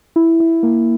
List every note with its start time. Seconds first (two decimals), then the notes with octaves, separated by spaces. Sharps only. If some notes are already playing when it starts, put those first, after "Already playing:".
0.16 E4
0.40 E4
0.63 A#3